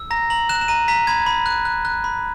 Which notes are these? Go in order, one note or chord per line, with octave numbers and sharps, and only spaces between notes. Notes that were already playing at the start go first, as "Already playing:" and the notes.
Already playing: E6
A#5 A#6
A#5 F#7
F#6 E7
E7
A#5 D#7
A#5 B6
B5 G#6
B5
F#6
F#6
F#6
B5